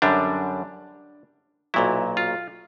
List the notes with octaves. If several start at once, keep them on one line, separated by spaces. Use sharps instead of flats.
F#2 D3 G3 D4
B1 A#2 F#3 E4
F4